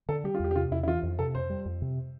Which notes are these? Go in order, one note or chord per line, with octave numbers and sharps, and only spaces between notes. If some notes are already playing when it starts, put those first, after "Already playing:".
D3 A4
G3 G4
F4
E2 G4
G4
C3 F4
E2 E4
E4
E3 F4
F2
C3 A4
F2 C5
G3
F2
C3